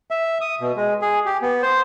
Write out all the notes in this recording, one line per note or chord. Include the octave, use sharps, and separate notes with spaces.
E5
D#6
B2
G#3
G#4
G4
B3
C5